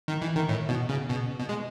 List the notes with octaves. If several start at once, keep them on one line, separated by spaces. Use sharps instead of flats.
D#3
E3
D#3
A2
B2
C#3
B2
B2
G#3